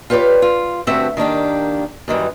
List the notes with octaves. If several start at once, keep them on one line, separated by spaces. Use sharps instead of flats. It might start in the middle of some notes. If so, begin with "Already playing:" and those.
F4 G4 B4 C#5 D5
F4
G2 D3 A3 C4 F#4 E5
D#3 A#3 D4 G4
F#2 D#3 E3 G3